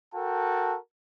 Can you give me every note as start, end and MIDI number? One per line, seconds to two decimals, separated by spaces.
0.14 0.77 66
0.14 0.77 69
0.14 0.77 70
0.14 0.77 79
0.14 0.77 81